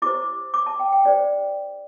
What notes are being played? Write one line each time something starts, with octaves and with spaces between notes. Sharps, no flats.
E4 G4 C5 D6
D6
A5
G5
G5
D4 G4 C5 D5